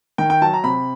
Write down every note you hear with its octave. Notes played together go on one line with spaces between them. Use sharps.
D#3 G5
G5
F#3 A5
A#5
C3 B5